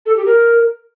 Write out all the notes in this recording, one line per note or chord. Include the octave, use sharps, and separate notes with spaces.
A4
G4
A#4